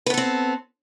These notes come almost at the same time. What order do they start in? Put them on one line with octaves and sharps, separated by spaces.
B4 B3 A4 C4